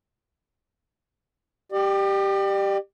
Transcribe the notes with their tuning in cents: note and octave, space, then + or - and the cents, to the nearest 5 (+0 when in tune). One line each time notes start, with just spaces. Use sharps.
G4 +0 D5 +40